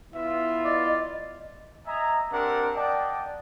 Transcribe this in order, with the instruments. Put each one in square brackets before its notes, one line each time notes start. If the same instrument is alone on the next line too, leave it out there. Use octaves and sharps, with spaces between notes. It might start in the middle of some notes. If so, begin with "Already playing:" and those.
[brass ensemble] B3 E4 F4 [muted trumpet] E5
[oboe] D5 [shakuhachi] D#5
[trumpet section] D#5 E5 G#5 A#5
C4 D4 G4 A#4 F#5
D5 D#5 F#5 G5 A5